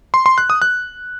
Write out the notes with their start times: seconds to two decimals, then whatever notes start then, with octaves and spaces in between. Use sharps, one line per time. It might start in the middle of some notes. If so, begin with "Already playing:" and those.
0.14 C6
0.26 C6
0.38 F#6
0.50 D#6
0.62 F#6